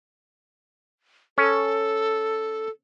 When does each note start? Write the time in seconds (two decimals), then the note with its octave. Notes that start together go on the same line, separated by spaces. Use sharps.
1.38 C#4 A4